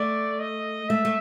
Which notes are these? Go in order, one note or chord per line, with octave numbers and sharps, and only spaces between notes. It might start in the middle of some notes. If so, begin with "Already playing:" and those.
Already playing: A3 D5
D#5
A3 E5
A3